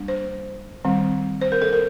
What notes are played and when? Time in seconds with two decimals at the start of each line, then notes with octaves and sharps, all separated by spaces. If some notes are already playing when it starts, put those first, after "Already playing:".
Already playing: G3 A#3 D4
0.08 C5
0.85 D#3 G3 C4
1.41 C5
1.52 A#4
1.62 A4
1.73 A#4